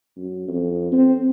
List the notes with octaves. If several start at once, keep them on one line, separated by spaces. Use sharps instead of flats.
F#2
F2
C4